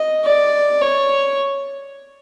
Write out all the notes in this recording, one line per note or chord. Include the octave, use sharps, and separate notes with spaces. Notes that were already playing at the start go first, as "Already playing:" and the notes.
Already playing: D#5
D5
C#5